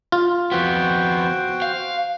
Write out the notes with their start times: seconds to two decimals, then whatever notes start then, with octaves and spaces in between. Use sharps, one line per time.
0.12 F4
0.52 F2 B3 F#4 C5 G5
1.62 F5